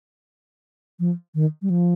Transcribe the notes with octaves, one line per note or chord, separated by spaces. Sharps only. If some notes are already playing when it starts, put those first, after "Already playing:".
F3
D#3
G3
F3